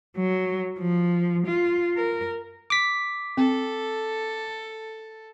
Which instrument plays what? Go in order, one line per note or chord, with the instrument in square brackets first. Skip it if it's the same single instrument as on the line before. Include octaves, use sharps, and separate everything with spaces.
[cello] F#3
F3
F4
A#4
[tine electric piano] D6 B6
[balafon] C4 [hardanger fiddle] A4